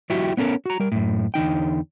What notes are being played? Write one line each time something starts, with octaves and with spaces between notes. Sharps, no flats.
F#3 E4 F#4 G4 E5 G5
B3 C#4 A4 A#4
F#4 A#5
G3 A#4
F#2 A2
E2 D3 D#4 G5